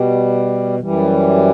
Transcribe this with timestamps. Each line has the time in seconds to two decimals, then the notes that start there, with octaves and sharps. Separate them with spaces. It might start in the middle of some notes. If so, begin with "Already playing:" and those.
Already playing: B2 G3
0.80 F#2 E3 G3